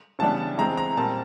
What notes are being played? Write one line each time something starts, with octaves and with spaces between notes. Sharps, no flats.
C#3 E3 G3 B3 D4 A5
E3 G#3 C4 A#5
A#5
A#2 G3 C4 A5